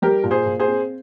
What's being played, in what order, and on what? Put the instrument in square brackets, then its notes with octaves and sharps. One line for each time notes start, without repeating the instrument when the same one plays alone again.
[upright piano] G3 G4 A#4
A#2
G#4 C5
A#2
G#4 C5
C4